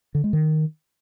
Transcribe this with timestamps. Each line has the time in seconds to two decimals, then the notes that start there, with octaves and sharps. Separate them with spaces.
0.15 D3
0.24 G#3
0.33 D#3